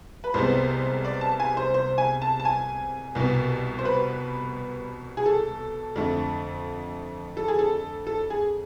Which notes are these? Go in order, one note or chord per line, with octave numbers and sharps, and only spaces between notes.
B4
C2 C3 G#3 B3 C5
D5
A5
G#5
C5
C5
G#5
A5
A5
G#5
C2 B2 B3
C5
B4
G#4
A4
F2 D3 A3
A4
G#4
A4
A4
G#4